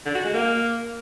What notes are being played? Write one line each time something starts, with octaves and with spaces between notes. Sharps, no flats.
D3
F#4
G#3
A#3